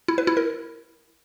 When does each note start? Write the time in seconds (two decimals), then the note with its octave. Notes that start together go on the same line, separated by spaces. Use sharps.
0.08 E4
0.18 B4
0.27 E4
0.37 A#4